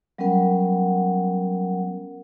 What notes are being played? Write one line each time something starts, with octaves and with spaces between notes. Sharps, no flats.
F#3 G3 B3 C#4 A#4 F#5